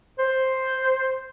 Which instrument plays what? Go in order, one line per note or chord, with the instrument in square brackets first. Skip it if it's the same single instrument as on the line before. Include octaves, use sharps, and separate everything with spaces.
[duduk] C5